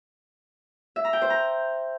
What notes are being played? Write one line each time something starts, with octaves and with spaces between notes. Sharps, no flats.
E5
A#5
G5
C5
A#5